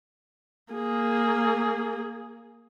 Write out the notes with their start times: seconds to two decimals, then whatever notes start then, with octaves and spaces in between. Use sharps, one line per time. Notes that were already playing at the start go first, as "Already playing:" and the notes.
0.73 A#3 G#4